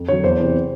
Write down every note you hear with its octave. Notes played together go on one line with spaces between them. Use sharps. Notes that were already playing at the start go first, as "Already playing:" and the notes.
Already playing: F2
D3 F#3 C#5
E2 C5
C3 E3